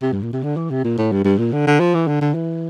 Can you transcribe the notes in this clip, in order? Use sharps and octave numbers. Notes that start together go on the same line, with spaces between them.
C3
G2
A#2
C3
D3
E3
C3
A#2
A2
G2
G2
A#2
D3
D3
F3
E3
D3
D3
E3